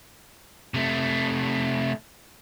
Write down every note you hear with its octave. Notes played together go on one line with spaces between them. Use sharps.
C3 A3